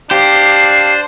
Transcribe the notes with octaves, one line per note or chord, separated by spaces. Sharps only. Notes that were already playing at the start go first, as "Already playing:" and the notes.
D4 G4 C5 F5